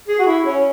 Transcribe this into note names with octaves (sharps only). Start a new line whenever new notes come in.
G#4
F#4
E4
C#4